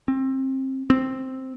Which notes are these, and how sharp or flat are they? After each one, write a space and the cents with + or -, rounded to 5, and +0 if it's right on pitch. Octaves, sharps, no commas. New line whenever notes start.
C4 +25
C4 +0